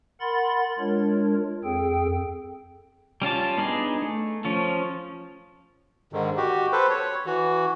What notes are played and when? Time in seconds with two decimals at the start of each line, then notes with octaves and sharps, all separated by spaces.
0.21 A#4 F#5 B5 C6 A6
0.79 G#3 D4 F4 A#4 C#5
1.64 F2 C4 G#4 A4 G5
3.22 G3 C#4 F4 A5
3.57 B3 D4 D#4 G#4
4.02 A3
4.45 F3 C#4 F4
6.13 G#2 D3 D#3
6.37 F#4 G4
6.72 A4 B4 C5
6.90 C#5
7.26 E3 F#4